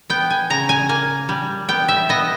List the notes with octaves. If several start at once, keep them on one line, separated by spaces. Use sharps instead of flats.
B3 G5
G#5
C#3 A#5
G#5
A#3 G#5
G3
B3 G5
E5
B3 D#5